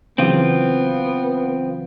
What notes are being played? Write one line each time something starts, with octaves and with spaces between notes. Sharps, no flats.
C#3 E3 F#3 B3 C4 F4